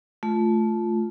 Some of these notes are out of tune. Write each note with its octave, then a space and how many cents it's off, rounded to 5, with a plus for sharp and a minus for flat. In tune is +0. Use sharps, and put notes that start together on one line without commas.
A3 -15 F4 +0